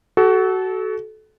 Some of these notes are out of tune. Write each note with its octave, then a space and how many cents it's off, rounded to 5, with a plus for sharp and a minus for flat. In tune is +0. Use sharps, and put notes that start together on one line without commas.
F#4 +20 A4 -25